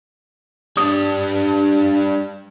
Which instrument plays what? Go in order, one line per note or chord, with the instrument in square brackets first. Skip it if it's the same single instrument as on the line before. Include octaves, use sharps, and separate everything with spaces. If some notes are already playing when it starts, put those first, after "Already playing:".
[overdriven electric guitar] G3 D4 [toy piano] D#6